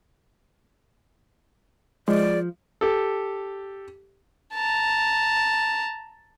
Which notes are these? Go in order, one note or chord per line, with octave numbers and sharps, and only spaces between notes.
F3 G#3 D5
G4 A4
A5 A#5